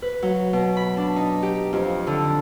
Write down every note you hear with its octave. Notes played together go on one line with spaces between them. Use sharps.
B4
F#3
B2
B5
D4
D#4
G4
F2
D3